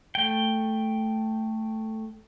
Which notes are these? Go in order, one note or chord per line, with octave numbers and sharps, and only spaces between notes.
A3 G5